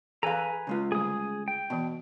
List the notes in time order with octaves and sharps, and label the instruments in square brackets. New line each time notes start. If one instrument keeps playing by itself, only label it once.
[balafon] E3 G#4 [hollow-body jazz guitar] A4 F5 [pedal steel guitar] B4 G#5 A#5
[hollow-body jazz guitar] C#3 G#3 F4
[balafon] D3 G3 A3 [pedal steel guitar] G#4 D#6
[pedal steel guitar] G5
[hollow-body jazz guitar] B2 [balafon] E3 B3 A5